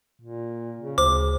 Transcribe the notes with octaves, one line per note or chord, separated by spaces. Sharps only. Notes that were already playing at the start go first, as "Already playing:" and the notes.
A#2
C#3
D2 C5 D6